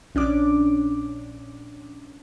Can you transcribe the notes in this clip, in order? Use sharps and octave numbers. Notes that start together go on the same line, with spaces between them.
A#1 C#4 D4 D6